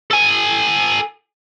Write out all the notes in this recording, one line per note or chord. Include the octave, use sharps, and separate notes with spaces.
A4 G#5